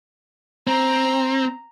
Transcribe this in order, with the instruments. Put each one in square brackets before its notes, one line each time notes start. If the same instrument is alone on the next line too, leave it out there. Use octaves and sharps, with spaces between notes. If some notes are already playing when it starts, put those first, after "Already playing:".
[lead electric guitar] C4 [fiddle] A#5